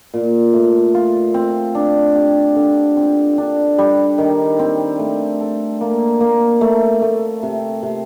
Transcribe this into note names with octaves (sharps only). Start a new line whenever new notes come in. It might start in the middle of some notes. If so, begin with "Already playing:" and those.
A#2
A3
F4
C4
D4
G4
D3
C4
D4
G3
D#3
C4
A3
A4
A#3
A#3
A3
A3
C3
C3